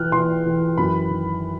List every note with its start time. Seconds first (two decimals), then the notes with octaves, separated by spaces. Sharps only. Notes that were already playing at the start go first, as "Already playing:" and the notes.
Already playing: E3 F6 F#6
0.12 E3 C6
0.45 E3
0.77 F#2 B5
1.10 D#3